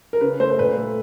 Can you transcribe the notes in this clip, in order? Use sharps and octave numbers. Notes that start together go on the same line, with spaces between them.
A#4
C#3 B4
A3 C5
C5
A#2 B4
A3